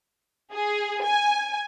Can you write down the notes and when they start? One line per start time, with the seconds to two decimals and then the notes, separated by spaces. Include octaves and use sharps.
0.52 G#4
1.03 G#5